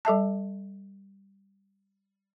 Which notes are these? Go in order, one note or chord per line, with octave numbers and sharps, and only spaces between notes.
G3 A4 E5 A5